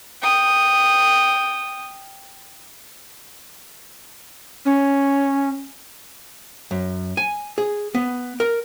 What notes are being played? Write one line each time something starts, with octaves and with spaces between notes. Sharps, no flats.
G5 D#6
C#4
F#2
G#5
G#4
B3
A#4